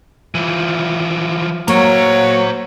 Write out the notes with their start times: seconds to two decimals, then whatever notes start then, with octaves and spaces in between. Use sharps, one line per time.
0.35 E3 F3
1.68 F#3 A#3 C5 C#5 A#5